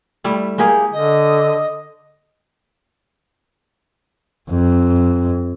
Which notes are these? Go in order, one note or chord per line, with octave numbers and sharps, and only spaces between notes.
G3 A3 E4
G#3 A#3 G4 G#4
D3 D#5
F2